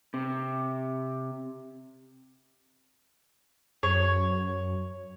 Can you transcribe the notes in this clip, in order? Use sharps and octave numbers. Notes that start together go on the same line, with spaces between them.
C3
F#2 C#5